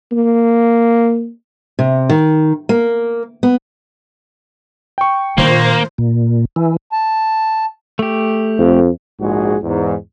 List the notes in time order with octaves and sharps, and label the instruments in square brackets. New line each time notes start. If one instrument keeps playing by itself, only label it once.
[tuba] A#3
[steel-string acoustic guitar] C3
D#3
A#3
B3
[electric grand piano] G5 C#6
[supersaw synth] A#2 C5 [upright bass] D#3 D4 [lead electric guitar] A#3
[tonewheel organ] A#2
E3
[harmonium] A5
[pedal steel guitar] A3 G4
[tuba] F2
[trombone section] A#1 G#2 F#4 G#4
E2 G#2